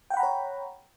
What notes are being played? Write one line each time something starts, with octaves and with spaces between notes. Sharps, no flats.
C#5 F#5 G5 A#5 B5